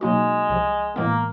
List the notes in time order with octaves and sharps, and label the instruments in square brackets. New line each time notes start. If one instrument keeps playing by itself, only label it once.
[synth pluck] B2 F#3 A#3 D#4 F#4 [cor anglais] G#3
[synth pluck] C2 C3 F3
[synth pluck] A2 E3 G#3 B3 [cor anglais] A#3